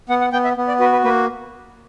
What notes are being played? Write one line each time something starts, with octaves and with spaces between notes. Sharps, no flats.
B3 F#5
F#5
B3 G5
E5
B3
D5
F#4 B4
B4
A#3 B4